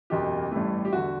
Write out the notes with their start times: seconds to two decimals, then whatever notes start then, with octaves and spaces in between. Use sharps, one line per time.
0.10 F#1 E2 B2 G4
0.51 A1 G2 E3 A3
0.85 G4
0.93 E2 D3 F#4